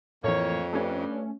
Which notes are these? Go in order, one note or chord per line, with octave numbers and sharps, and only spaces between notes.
F2 A2 E3 A#3 C#5
G2 A3 C#4